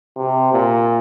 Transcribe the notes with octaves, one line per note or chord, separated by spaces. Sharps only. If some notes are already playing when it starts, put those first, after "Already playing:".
C3
A#2